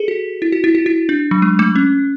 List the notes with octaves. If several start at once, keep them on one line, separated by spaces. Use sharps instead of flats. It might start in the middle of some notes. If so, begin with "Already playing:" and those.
Already playing: G#4 A4
F#4
E4
F#4
E4
F#4
E4
D4
F#3
G#3
A3
C#4